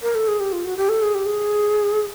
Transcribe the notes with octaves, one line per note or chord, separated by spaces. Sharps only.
A#4
A4
G#4
G4
F4
F#4
G4
A4
G#4
G4
G#4